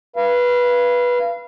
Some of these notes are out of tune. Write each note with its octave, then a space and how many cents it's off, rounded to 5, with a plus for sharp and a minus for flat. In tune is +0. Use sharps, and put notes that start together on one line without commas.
B4 -15 F5 -30